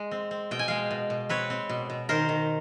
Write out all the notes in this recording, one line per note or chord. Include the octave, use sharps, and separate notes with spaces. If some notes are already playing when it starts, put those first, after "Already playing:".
Already playing: G#3
C4
C4
B2 G5
G#5
G#3 F5 G5
B2
B2
C4 B4 C#5
C4
B2
B2
D#3 A#4 C5
D#3